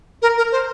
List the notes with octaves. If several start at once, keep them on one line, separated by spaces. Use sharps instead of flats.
A#4
A#4
C5